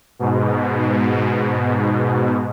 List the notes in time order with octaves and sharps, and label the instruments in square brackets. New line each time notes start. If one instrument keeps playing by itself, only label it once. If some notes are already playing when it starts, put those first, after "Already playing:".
[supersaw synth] G#2 B2